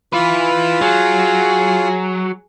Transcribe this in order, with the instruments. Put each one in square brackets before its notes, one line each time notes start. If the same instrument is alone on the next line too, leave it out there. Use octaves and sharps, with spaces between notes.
[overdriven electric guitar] E4 B4 [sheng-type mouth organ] F4
[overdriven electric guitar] F#3 [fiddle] G#4